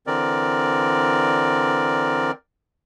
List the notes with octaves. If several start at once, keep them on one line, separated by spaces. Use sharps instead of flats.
D3 E3 C4 A#4 D5